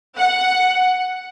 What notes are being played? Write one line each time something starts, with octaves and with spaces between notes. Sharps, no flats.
F#5